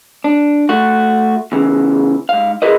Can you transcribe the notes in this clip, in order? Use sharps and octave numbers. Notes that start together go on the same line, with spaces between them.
D4
A3 F#4
E2 C#3 E3
G#2 F5
E4 F#4 G#4 A#4 B4 D#5